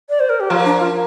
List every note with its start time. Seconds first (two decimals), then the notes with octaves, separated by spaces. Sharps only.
0.09 D5
0.20 C5
0.29 A#4
0.40 G4
0.50 F3 A#3 F4
0.65 D4
0.80 F4